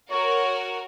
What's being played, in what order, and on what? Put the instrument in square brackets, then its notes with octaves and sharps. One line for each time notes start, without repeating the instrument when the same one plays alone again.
[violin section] F#4 A#4 [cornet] C#5